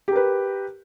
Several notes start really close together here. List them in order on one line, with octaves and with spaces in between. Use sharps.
G4 A#4 B4